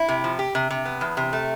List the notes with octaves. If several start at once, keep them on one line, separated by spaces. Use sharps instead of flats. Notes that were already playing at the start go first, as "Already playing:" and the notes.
Already playing: E4
C3
F3
G4
C3
C3
B3
E2
C3
A3